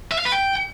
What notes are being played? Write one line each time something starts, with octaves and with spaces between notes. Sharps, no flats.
E5
F5
B4
G5